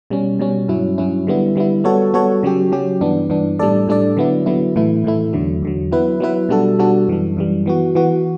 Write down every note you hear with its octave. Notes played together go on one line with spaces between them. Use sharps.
B2 G3 C#4
B2 G3 C#4
G2 F#3 C#4 E4
G2 F#3 C#4 E4
D3 G3 B3 E4
D3 G3 B3 E4
G3 B3 F#4 A4 C#5
G3 B3 F#4 A4 C#5
C#3 F#3 C#4 G4
C#3 F#3 C#4 G4
G2 E3 B3 D4
G2 E3 B3 D4
A2 G3 D4 A4 D5
A2 G3 D4 A4 D5
D3 F#3 B3 E4
D3 F#3 B3 E4
A2 E3 A3 E4
A2 E3 A3 E4
E2 D3 F#3
E2 D3 F#3
F#3 B3 E4 B4
F#3 B3 E4 B4
B2 G3 D4 F#4 A4
B2 G3 D4 F#4 A4
F#2 E3 G3
F#2 E3 G3
E3 B3 F#4
E3 B3 F#4